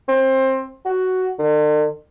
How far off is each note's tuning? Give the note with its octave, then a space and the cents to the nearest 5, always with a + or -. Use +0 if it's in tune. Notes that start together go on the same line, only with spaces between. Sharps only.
C4 +20
F#4 +10
D3 +45